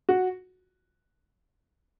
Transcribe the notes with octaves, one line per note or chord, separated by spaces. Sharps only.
F#4